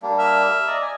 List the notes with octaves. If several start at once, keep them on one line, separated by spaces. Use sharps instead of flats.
G3 A#3 D4
E5 F6
D5 D#5 A#5
G#5